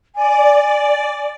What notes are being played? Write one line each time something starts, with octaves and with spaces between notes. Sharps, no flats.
D5 G#5